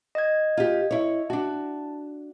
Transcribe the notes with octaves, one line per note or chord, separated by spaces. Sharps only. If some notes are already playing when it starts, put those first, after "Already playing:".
D#5 G#6
F4 G4
E4 C#5
D4 F#4 A5